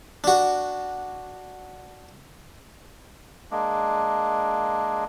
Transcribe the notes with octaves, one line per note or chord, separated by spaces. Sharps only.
D4 F#4
G#3 A#3 D4